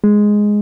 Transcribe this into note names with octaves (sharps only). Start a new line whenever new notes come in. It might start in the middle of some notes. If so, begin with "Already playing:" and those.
G#3